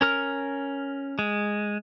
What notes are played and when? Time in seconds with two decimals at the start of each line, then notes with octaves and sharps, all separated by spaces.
0.01 C#4 A#4 F6
1.19 G#3